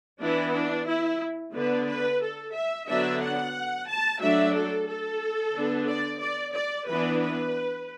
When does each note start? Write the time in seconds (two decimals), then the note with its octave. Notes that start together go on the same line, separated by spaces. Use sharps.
0.20 E3 B3 D4 E4
0.54 D4
0.87 E4
1.53 D3 B3 D4 B4
1.87 B4
2.21 A4
2.53 E5
2.87 D3 F#3 B3 D4 E5
3.21 F#5
3.87 A5
4.20 F#3 A3 D4 E5
4.54 A4
4.87 A4
5.53 D3 B3 D4
5.86 D5
6.20 D5
6.54 D5
6.86 E3 B3 D4 B4
7.20 B4